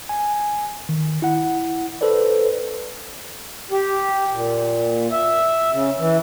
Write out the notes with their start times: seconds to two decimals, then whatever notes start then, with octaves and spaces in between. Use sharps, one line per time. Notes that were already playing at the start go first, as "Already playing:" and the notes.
0.09 G#5
0.89 D#3
1.22 E4 F#5
2.01 A4 B4 C5 D5
3.71 G4
4.32 A#2
5.12 E5
5.73 C#3
5.99 E3